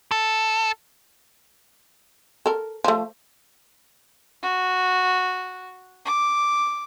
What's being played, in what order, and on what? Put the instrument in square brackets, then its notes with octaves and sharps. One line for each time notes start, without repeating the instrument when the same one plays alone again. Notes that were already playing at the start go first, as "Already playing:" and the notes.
[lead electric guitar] A4
[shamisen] A4 A#4
F3 A3
[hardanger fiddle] F#4
D6